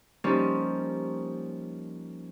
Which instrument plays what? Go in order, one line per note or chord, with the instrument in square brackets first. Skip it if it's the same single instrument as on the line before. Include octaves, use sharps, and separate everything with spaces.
[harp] F3 G3 A#3 C#4 D#4